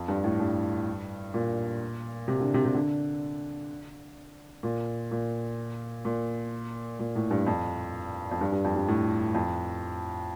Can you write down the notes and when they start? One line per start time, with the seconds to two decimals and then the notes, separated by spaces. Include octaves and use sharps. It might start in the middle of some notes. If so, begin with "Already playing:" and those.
Already playing: F2
0.08 G2
0.24 A2
0.40 G2
1.34 A#2
2.28 C3
2.41 D3
2.54 C3
2.65 C3
2.75 D3
4.63 A#2
5.11 A#2
6.05 A#2
6.99 A#2
7.15 A2
7.31 G2
7.46 F2
8.31 F2
8.41 G2
8.52 G2
8.64 F2
8.76 G2
8.88 A2
9.34 F2